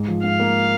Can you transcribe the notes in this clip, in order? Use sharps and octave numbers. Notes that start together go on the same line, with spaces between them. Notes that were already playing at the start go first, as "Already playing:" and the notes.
Already playing: G#2
F3
G#2 F5
A#3